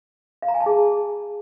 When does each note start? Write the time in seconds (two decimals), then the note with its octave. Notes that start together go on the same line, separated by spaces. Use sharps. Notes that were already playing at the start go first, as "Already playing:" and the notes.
0.42 F5
0.48 A#5
0.54 G#5
0.60 A5
0.66 G#4